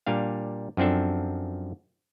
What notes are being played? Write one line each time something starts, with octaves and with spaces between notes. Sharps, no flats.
A#2 G3 D4 F5
F#2 F3 C4 D4 A4